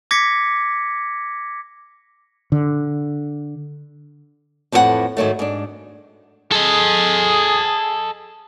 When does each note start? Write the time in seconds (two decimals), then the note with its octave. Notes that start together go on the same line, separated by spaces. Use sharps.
0.11 D6 G#6 A#6 B6 C#7
2.52 D3
4.72 F2 A2 E3 G#4 F#5
5.17 G#2 D#3 F#3 A3
5.39 G#2 D4
6.52 G#4 A4 D#5